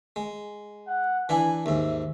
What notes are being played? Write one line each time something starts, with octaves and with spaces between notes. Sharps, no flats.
G#3
F#5
E3 D4 E4 G#5
D#2 G#2 E5